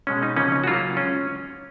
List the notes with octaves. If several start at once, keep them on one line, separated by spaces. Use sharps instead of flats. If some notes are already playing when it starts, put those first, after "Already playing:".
B2 G#3 C#4
D#4
C#3 F3 A#3 C#4
C#4
F#4
C#3 F#3 A#3 F4
G#3 C#4